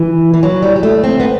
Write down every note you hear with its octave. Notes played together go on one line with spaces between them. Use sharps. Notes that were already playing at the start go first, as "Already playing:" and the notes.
Already playing: E3
E3
F#3
G3
G3
A3
C4
B3